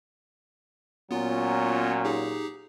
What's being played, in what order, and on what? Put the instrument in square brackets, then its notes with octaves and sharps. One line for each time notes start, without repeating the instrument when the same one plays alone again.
[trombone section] A#2 F#3 C#4 [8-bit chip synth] B3 F4
[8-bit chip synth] D#4 G4 G#4